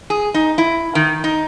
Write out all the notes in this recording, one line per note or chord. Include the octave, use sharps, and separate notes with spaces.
G#4
D#4
E4
D#3
D#4